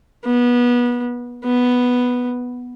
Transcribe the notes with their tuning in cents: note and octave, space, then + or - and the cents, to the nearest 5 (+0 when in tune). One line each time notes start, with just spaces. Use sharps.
B3 -25
B3 +0